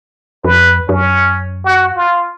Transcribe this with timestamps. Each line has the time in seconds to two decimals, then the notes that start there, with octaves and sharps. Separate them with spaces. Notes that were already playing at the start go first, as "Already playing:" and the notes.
0.44 F2 B4
0.89 F#2 C#4
1.64 F#4
1.96 F4